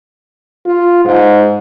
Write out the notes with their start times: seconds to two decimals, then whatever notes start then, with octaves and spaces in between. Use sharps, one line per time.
0.66 F4
1.05 G#2